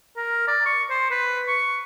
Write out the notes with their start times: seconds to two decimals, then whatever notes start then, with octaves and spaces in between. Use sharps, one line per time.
0.17 A#4
0.47 D5
0.66 C#6
0.90 C5
1.11 B4
1.48 C#6